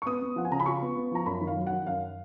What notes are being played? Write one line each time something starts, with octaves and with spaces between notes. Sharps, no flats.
C#6
B3 D#6
B3
F3 F#5
G#5
C#3 A#5
B5
F4 C#6
B3
B3
F3 A#5
F#2 B5
D#3
F5
F#3
F#5
D#3
F#2 F5